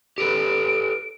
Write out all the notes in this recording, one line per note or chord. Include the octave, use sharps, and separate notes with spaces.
G4 A4 B4 D7